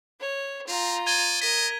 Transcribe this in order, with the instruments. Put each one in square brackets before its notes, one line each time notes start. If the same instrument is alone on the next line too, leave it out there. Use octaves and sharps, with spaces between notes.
[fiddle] C#5
[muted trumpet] C4 [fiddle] F4 A#5
[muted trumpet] D5 [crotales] G#6 D#7 G7
[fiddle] A#4 [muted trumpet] D#5 [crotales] B6 D#7